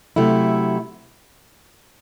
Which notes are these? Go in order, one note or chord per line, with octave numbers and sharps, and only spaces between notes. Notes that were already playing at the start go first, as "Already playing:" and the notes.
C3 F#3 A3 E4